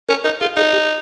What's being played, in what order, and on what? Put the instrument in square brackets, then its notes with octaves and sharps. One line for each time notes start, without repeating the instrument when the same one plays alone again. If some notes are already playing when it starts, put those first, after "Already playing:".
[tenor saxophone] C#4 [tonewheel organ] A#4
[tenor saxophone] D#4 [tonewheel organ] A#4
[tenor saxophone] F4 [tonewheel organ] G#4
[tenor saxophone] D#4 [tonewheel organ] G#4
[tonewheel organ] G4